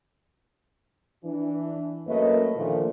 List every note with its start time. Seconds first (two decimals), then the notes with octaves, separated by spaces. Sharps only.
1.24 E3 D4
2.08 F#2 A3 A#3 C#4 B4 D#5
2.57 A#2 D3 D#3 F3 A3 A#3